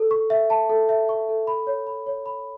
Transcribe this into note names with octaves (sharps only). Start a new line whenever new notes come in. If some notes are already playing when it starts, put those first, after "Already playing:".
Already playing: A4
C#6
E5
A5
A4
E5
C#6
A4
B5
C#5
B5
C#5
B5